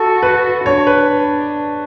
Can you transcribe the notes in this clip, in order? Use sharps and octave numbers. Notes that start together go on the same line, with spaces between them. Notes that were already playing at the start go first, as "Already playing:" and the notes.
Already playing: F#4 A4
B4
D4 C#5
B4